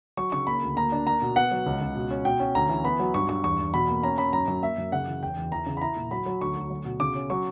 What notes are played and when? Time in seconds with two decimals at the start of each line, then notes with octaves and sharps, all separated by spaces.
0.17 F#3 C#6
0.32 C#3 C#6
0.47 A#3 B5
0.62 D2
0.77 A#3 A#5
0.92 D4
1.06 A#3 A#5
1.22 B2
1.36 B3 F#5
1.51 F#3
1.66 C#2
1.81 C#2
1.95 B2
2.11 C#4
2.25 B2 G5
2.40 C#4
2.55 D2 A#5
2.69 E3
2.84 B3 B5
3.00 F#3
3.14 G2 C#6
3.29 G2 C#6
3.44 E2 C#6
3.59 E2
3.74 B2 B5
3.88 A#3
4.03 C#4 A#5
4.18 C#4 B5
4.33 F#2 A#5
4.48 F#2
4.63 A#3 E5
4.78 F#2
4.92 C#3 F#5
5.07 E3
5.22 E2 G5
5.37 E2
5.51 E3 A#5
5.66 C#3
5.77 B5
5.81 E4 A#5
5.96 A#2
6.11 F#3 B5
6.26 F#3
6.41 D2 C#6
6.56 D2
6.70 F#3
6.85 B2
7.00 C#3 D6
7.15 C#4
7.30 F#3 C#6